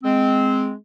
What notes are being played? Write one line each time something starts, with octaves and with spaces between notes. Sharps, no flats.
G#3 C4